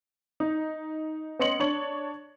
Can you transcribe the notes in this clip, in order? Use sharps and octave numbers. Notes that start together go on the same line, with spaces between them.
D#4
B3 C#4 D#5 C6 C#7 F#7
D4 C#5 F#7